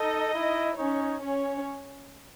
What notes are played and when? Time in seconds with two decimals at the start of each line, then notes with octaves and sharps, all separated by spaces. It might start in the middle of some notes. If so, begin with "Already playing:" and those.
Already playing: D#4 A4 D#5
0.34 E4
0.77 C#4 D#4 C#5
1.21 C#4 C#5